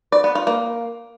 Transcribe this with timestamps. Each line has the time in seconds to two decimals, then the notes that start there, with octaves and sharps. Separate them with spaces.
0.12 D5
0.24 B3
0.35 F4
0.47 A#3